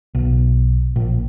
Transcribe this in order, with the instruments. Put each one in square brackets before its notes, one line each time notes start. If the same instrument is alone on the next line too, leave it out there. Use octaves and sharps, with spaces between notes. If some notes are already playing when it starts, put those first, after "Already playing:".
[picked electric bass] B1
A#1